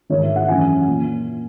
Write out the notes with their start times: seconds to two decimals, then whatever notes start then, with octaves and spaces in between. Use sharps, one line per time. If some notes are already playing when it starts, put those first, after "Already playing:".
0.10 G#2 D#3 C#5
0.23 E5
0.36 F#5
0.49 F#2 C#3 E3 G#5
0.88 A#2